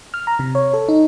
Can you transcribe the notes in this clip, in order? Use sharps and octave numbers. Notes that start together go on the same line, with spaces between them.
F6
A#5
C3
C#5
A4
D#4